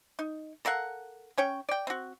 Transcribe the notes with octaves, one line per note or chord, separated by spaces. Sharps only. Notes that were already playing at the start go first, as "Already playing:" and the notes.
D#4
A4 A#4 F5 F#5
C#4 C#5 G5
D5 G5
C4 F#4